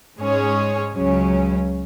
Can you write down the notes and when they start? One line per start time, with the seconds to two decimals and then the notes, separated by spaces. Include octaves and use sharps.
0.19 G#2 G#3 C#4 G#4 C#5
0.94 C#2 C#3 F#3 C#4